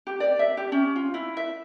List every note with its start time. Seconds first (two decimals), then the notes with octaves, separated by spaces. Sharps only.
0.07 G4
0.20 D5
0.39 E5
0.57 G4
0.72 C#4
0.96 F4
1.14 E4
1.37 E5